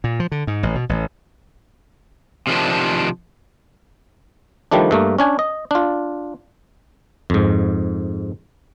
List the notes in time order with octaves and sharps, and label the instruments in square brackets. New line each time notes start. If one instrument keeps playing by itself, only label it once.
[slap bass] A#2
F3
D3
G#2
A1
B2
A1
[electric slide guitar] C3 D#3 F3 D4
[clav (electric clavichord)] D#3 F3 G3 A3 D4
G2 A3 A#3
C#4 D4 G#5
D#5
D4 F4
F2 G#2